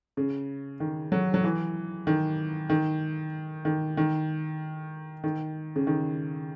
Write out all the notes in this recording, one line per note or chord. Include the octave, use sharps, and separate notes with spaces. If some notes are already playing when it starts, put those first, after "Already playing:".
C#3
D#3
F#3
F#3
E3
D#3
D#3
D#3
D#3
D#3
C#3
D#3